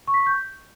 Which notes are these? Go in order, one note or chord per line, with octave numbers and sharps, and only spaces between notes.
C#6
B6
C#6
G6